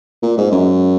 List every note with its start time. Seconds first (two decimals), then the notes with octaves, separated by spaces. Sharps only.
0.23 A#2
0.37 G#2
0.51 F#2